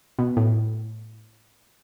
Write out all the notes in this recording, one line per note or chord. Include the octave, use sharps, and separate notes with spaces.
B2
A2